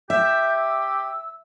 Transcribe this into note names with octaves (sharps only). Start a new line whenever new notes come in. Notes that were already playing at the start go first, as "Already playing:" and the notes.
G4 E5 G6
E6